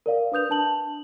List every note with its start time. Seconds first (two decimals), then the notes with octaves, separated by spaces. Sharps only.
0.06 A#4 D5 F5
0.32 D4 B4 D#6 G6 F7
0.50 D4 A5 F#7